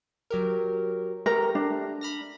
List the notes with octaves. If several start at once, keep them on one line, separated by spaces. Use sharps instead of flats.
F#3 G4 A#4
A3 G4 A#4 A#5
D4
B5 F6 A#6